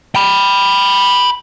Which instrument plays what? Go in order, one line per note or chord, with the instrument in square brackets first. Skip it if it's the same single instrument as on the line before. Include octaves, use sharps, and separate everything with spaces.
[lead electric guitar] G5 B5